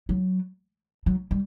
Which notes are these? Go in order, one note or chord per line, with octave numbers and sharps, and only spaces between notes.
F#3
F#3
G3